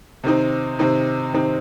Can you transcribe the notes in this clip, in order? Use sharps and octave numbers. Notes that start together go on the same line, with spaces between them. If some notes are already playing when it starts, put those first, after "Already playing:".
C3 D#3 C4 D#4
C3 D#3 C4 D#4
C3 D#3 C4 D#4